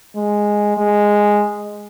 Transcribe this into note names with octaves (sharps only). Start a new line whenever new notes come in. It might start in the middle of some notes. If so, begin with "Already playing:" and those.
G#3
G#3